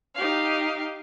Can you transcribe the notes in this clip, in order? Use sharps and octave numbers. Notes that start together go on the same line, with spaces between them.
D#4 G4 F5